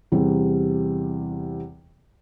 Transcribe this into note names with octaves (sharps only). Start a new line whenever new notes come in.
E2 C3 G3